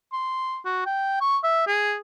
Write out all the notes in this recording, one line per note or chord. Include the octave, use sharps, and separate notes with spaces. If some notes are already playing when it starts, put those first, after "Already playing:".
C6
F#4
G5
C#6
E5
G#4